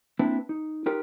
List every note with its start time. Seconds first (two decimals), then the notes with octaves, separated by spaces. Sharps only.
0.19 A#3 C4 D4 E4 B4
0.49 D#4
0.86 D#4 F4 G4 A#4 B4